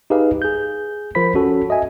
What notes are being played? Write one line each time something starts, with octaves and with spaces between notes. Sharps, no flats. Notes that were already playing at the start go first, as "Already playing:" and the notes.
D#4 G4 G#4 B4 D#5 F5
G#4 G6
F3 F4 A#4 C5 B5 B6
C#4 F#4 A4
D#5 E5 G#5